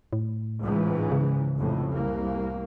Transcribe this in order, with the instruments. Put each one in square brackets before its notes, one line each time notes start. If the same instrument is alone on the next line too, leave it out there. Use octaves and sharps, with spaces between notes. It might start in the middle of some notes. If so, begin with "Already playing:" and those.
[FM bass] A2
[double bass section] C#2 G#2 E3
[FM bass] C#3
[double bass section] F1 F2 A2
C2 A#3